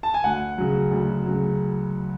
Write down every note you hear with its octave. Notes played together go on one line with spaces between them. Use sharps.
A5
G#5
D2 F#5
C#3 F#3
D2
C#3 F#3